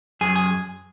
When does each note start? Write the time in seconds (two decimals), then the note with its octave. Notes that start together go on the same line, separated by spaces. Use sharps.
0.21 F#2 G#4
0.36 G#4